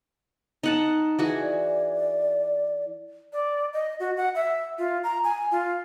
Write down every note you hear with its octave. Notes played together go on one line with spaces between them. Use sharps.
D#4 F#5 A5
E3 F#4 G#4
D5
D5
D#5
F#4
F#5
E5
F4
A#5
G#5
F4